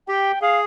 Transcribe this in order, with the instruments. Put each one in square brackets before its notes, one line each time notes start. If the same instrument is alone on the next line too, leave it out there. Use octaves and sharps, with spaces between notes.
[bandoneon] G4 [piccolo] G5
[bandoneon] G#4 [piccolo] F5